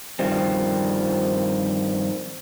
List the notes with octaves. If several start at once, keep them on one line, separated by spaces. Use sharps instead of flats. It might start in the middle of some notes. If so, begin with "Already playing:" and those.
G2 D#3 F3 G3 C4